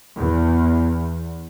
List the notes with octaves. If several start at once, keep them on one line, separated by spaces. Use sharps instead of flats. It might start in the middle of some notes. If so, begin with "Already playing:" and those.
E2